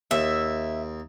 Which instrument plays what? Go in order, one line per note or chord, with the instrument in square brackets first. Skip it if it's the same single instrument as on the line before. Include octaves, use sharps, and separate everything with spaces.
[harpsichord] D#2 [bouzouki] E5